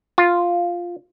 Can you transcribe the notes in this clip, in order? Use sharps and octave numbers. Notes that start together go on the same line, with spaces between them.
F4